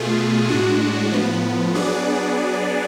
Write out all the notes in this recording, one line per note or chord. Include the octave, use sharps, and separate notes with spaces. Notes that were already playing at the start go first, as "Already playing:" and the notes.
Already playing: B2 A3 F4 G#4
A2 G#3 D4 F#4
A2 F3 B3
F#3 B3 D4 G#4 D5